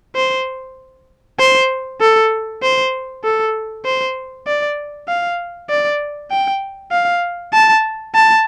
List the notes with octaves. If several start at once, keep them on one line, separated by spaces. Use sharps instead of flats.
C5
C5
A4
C5
A4
C5
D5
F5
D5
G5
F5
A5
A5